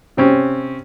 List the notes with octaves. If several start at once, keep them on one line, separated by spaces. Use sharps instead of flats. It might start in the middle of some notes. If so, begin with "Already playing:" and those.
C3 C4 C#4